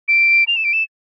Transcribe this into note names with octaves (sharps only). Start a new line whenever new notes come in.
D7
F7
E7
D7
E7